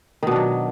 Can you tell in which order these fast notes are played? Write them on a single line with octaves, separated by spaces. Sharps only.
D#3 B2 D4 F#3